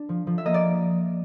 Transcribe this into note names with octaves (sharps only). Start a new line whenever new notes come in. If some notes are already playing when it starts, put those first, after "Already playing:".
Already playing: D4
F3
F3
E5
A#3 D#5
D5